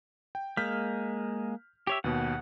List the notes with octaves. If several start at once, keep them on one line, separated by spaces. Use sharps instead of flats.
G5
G#3 A#3 F6 G6 B6
G4 C#5 E5
D#2 B2 F#5